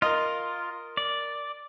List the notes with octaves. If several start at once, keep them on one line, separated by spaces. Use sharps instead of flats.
F4 A#4 D#5
D5